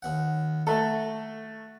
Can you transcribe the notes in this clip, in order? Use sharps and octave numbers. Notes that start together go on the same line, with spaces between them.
D#2 F#5
A3 F#4 A4